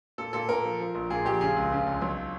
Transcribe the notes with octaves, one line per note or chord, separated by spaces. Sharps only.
A#2 A4
A#2 A4
A#2 A#4
F3
F3
A#1
A#2 G#4
A#1 G4
C#3 G#4
C#2
C#3
C#2
B1